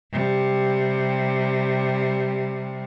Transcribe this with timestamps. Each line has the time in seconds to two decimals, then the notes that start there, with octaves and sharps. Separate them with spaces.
0.12 C3 G3